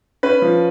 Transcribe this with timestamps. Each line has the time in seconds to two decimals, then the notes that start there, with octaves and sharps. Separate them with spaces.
0.23 C#4 B4
0.42 F3